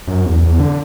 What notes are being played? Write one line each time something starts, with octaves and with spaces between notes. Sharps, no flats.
F#2
E2
E2
D3